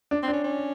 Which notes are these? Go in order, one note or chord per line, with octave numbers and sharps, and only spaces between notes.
D4
C4
D4
C#4
C#4